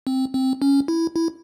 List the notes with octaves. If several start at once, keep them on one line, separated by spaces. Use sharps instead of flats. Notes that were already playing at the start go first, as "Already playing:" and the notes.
C4
C4
C#4
E4
E4